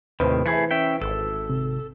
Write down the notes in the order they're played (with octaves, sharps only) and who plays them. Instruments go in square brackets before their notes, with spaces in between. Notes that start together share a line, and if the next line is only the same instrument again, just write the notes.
[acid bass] D#2 [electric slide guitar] A2 C3 D#3 [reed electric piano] B4 C5
[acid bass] E3 [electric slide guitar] A3 E4 G#4
[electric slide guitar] C#4 E5 G5
[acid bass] G#1 [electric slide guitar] A4
[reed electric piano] C3